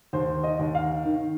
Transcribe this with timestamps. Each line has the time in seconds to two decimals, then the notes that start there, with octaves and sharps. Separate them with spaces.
0.13 D#2 C5
0.43 D#5
0.59 D#2
0.75 F5
1.05 D#3